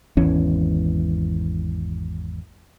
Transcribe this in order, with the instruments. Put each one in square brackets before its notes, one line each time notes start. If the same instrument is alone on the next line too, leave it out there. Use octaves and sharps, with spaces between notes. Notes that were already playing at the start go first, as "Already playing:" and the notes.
[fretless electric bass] G#1 E2 E3 C#4